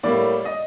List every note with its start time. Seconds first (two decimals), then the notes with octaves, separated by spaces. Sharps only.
0.03 A2 G3 A#3 D5
0.45 D#5